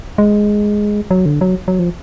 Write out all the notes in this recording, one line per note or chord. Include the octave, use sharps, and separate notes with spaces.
G#3
F#3
D3
F#3
F#3
F3